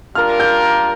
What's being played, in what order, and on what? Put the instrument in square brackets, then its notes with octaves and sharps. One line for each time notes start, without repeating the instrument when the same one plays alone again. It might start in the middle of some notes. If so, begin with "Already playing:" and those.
[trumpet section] G3 D4 F4 A#4 [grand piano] F6
[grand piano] G6